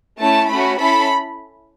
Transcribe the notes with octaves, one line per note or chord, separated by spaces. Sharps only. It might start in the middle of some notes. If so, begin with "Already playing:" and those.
A3 C#4 E4 A5
A3 C#4 F#4 B5
C#4 E4 A4 B5